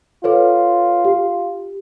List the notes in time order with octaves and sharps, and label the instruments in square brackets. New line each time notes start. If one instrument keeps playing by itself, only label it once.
[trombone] F4 [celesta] A4 B4 C#5
[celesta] G4